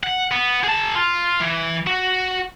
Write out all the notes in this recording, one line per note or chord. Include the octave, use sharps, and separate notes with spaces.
F#5
B3
G#4 A5
F4
E3
F#4